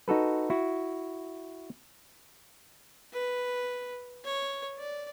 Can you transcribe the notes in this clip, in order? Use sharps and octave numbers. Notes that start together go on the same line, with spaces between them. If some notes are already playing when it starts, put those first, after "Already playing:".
D#4 F#4 A4 B4
E4 F#4
B4
C#5
D5